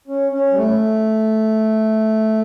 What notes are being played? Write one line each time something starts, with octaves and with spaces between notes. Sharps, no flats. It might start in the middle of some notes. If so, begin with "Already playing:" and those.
C#4
C#4
G3
A3